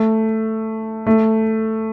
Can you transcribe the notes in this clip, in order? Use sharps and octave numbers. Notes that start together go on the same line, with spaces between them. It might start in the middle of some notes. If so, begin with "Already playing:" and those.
Already playing: A3
A3